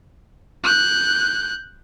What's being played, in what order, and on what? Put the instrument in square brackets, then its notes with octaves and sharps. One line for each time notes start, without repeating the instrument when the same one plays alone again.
[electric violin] F#6 G6